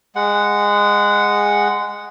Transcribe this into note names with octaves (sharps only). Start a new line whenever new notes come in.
G#3 F#5